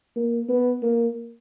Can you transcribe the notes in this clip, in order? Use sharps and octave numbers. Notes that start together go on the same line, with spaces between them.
A#3
B3
A#3